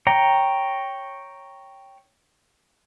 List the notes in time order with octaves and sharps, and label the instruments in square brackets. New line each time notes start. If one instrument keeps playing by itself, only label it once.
[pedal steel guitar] C#5 G5 A#5